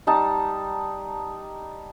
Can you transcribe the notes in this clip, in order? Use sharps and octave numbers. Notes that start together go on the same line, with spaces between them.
G3 D#4 A5